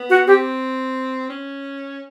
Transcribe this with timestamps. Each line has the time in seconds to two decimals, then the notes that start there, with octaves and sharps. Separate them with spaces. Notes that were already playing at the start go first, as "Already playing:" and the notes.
Already playing: B3
0.10 F#4
0.27 C4 G4
1.29 C#4